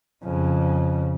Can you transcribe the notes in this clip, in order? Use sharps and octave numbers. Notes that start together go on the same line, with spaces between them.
F2 C#3